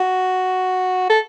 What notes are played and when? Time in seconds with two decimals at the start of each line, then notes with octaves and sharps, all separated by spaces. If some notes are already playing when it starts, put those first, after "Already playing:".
Already playing: F#4
1.09 A4